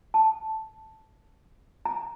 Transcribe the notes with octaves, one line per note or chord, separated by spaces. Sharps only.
A5
A#5